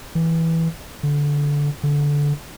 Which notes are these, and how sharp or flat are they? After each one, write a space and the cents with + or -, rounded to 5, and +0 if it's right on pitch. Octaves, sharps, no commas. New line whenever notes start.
E3 -10
D3 -15
D3 -15